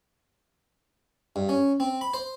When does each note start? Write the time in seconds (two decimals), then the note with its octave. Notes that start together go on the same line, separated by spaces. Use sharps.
1.36 G2
1.49 C#4
1.80 C4
2.01 B5
2.14 C5